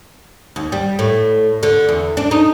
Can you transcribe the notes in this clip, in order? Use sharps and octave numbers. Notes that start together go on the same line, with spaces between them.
D#2
G3
A2
D3
E2
D4
D#4